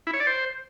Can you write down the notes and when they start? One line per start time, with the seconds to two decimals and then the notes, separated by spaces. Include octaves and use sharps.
0.07 E4
0.13 C#5
0.20 D5
0.27 C5